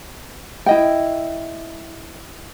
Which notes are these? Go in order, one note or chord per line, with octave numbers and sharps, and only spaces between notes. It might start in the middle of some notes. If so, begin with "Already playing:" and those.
E4 D#5 G5